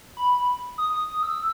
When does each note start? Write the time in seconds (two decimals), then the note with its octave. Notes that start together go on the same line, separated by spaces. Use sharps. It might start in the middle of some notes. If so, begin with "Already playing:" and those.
0.17 B5
0.78 D#6
1.23 E6